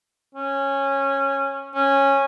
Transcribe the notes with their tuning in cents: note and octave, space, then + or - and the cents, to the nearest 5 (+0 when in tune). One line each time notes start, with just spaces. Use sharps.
C#4 -15
C#4 -10